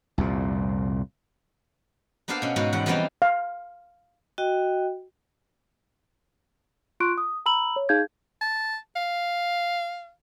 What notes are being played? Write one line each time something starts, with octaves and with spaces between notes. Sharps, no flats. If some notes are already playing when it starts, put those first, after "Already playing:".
C2 F2 A#2
A#3 B3 D4 A4 C5 F5
B2 C#4
G#2 B2 B3 F#4
E2 G3 F#5
E3 F3 G3 B3 C4 D#4
F5
F#4 D#5 G5
F4 C6 C#6 F#6 D7
D#6
A#5 B5 E6 F#7
C#5
D#4 G#4 F5 G6 G#6
A5
F5